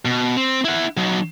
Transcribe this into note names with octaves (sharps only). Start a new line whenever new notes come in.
B2
C4
E4 F#5
F#3 D#4